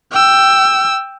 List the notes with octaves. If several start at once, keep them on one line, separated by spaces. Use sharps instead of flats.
G5 E6